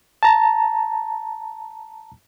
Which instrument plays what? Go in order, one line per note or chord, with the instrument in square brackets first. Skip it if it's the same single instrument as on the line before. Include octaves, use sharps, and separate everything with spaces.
[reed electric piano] A5 A#5